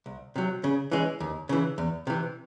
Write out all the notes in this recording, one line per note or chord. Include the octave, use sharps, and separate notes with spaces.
C2
C3 F#3
C#3
E3 G#3 C#4
D#2
C#3 E3
E2
C3 E3